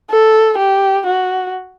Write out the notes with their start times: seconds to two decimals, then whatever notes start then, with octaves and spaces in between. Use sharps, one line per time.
0.10 A4
0.58 G4
1.06 F#4